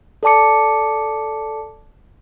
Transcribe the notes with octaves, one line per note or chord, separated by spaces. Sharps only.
A4 D5 A5 D6 C#7